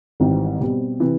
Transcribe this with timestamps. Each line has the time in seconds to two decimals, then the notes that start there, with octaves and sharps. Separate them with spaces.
0.20 G#1 G#2 E3 G3 C4
0.60 B2 G3 C4
1.00 C3 E3